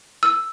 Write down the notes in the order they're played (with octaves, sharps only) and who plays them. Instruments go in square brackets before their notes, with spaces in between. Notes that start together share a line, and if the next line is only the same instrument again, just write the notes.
[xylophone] E6